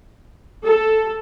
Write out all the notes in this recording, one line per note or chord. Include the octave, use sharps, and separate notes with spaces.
A4